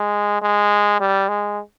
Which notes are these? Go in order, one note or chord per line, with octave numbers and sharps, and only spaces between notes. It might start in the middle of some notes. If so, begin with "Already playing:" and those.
Already playing: G#3
G#3
G3
G#3